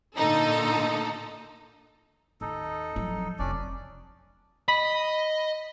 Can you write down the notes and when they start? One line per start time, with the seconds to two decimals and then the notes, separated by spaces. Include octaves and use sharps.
0.16 A#2 D3 D#4 A4
2.41 D#2 D#4 A4
2.96 F3 F#3
3.39 F1 C#4 D4 F4 D5
4.68 D#5 B5